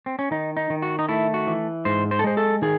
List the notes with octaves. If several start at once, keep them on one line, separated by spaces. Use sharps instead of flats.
C4
C#4
D#3 D#4
D#4
D#3
F#4
D#4
A3 E4
F#4
E3
G#2 C5
C5
A4
G#3 C5
A4
D#3 G#4